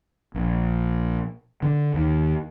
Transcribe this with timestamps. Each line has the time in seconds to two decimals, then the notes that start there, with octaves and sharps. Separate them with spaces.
0.34 A#1
1.62 D3
1.94 D#2